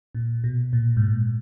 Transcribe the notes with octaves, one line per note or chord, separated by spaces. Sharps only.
A#2
B2
A#2
G#2
A#2